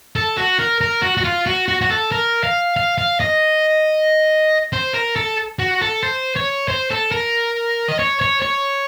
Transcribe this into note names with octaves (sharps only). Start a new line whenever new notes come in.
A4
F#4
A#4
A#4
F#4
F#4
F4
F#4
F#4
F#4
A4
A#4
F5
F5
F5
D#5
C5
A#4
A4
F#4
A4
C5
C#5
C5
A4
A#4
D#5
C#5
C#5
C#5